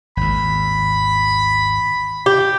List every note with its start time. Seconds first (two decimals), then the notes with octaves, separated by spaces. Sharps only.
0.17 G#1 D#2 B5
2.26 G4